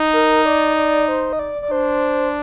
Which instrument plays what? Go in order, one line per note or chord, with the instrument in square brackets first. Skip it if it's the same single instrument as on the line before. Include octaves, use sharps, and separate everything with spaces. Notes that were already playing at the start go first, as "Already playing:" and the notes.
Already playing: [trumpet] D#4
[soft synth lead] A#4
D5
D5
C5
D#5
D5
D5
[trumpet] D4 [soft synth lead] C5